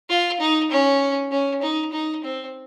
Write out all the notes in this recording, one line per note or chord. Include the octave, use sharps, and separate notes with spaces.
F4
D#4
C#4
C#4
D#4
D#4
C4